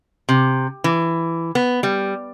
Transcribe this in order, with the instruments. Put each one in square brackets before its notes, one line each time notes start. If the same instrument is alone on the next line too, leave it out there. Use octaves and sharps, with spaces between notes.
[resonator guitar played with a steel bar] C3
E3
B3
G3